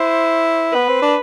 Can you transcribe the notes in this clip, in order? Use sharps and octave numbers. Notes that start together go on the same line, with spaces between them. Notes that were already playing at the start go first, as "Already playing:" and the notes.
Already playing: E4 C5
B3 B4
C4
D4